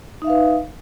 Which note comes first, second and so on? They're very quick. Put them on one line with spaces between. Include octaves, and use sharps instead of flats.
D#4 E5 F5 B4